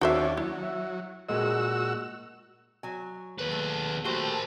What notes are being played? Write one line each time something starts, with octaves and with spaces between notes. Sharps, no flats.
D#2 C#4 D4 F#4 C5 E5
F#3 E4
E5
A#2 G#3 F#4 D#5 E6
F#3 G#5
D#2 B4
A3
A3 F#4 G4 A#4 C5